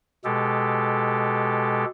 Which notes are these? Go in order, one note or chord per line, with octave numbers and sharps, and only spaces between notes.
B2 G#3 G4 A4